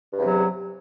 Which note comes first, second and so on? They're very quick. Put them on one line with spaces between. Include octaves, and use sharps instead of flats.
G2 E2 C3 F#3